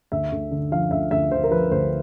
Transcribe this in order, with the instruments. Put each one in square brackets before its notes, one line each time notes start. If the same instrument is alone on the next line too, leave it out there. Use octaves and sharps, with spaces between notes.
[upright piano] D2 E5
D2
D3
F3 F5
D2 E5
D2 E5
D3 C5
A#4
F3 B4
D2 C5